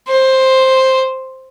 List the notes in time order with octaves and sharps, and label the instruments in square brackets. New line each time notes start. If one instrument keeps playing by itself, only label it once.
[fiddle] C5